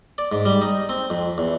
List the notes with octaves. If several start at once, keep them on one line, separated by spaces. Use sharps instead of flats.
D5
G#2
G3
D#4
C4
F2
E2